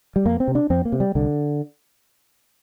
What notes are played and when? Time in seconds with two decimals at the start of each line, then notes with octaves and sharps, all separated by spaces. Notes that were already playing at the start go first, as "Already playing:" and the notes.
0.16 G3
0.25 F2 A#3
0.40 C4
0.48 C3
0.55 D4
0.70 F2 C4
0.85 A#3
0.92 C3
1.00 G3
1.15 C2 D3